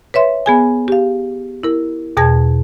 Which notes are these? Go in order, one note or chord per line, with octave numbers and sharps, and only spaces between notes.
B4 C#5 E5 C6
B3 G#4 G#5
G4 F5
E4 A#4
E2 B2 G#4 A5 G#6 A#6